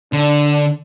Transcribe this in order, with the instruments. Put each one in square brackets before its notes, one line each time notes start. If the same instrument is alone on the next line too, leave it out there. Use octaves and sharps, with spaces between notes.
[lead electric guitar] D3 [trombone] D4